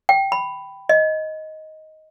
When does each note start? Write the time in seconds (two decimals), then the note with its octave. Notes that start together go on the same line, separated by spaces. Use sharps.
0.09 G5
0.32 B5
0.89 D#5